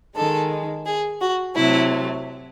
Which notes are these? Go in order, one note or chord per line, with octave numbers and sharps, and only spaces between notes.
D#3 G#3 A4
G#4
F#4
C3 F#3 A3 E4